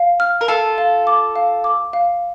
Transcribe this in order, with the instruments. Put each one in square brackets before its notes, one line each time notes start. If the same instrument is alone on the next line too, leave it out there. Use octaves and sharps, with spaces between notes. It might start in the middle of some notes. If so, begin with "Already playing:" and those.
Already playing: [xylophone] F5
F6
[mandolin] A#4
[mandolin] F4 A4 [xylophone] A5
[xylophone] F5
D6
F5
D6
F5